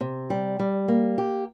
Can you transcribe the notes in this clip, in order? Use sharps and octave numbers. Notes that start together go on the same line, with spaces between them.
C3
G3
G3
A#3
G4